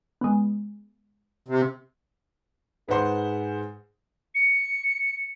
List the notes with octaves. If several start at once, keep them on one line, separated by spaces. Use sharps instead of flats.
G#3 B3
C3
G#2 G#4 B4 C5 F#5 C6
C#7